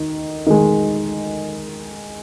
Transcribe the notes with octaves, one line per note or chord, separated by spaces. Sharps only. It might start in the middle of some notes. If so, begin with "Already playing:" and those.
Already playing: D#3
D#3 G#3